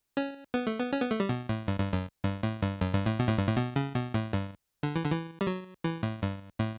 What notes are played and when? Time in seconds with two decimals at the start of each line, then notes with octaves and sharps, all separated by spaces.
0.17 C#4
0.54 B3
0.67 A3
0.79 B3
0.93 C#4
1.01 B3
1.11 A3
1.20 G3
1.29 B2
1.49 A2
1.67 G2
1.80 G2
1.93 F#2
2.24 G2
2.43 A2
2.62 G2
2.81 F#2
2.94 G2
3.06 A2
3.19 B2
3.28 A2
3.38 G2
3.48 A2
3.57 B2
3.76 C#3
3.95 B2
4.14 A2
4.33 G2
4.83 D3
4.96 E3
5.04 D3
5.12 E3
5.41 G3
5.47 F#3
5.84 E3
6.03 A2
6.22 G2
6.59 A2